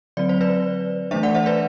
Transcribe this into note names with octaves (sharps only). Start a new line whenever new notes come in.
D3 F#3 C4 D5
C5
B4 D5
E3 A3 D4 C5 E5
D5 F#5
C5 E5
B4 D5